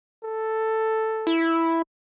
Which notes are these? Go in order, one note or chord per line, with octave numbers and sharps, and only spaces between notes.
A4
E4